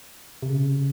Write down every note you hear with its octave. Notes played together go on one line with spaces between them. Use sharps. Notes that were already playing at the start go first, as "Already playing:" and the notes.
C3
C#3